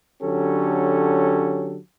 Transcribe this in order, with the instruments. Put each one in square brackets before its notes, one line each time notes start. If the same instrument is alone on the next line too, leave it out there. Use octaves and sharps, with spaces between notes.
[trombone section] D3 F#3 C#4 G4 A4